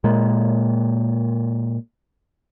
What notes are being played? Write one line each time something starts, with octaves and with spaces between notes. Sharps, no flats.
A#2 G#3 A#3